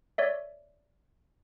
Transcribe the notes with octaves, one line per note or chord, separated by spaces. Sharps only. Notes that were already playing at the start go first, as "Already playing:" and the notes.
C#5 D5 E5